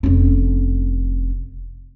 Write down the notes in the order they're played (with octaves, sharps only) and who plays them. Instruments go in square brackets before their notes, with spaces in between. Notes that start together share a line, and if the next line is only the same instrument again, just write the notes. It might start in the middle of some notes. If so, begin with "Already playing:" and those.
[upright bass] F1 C#4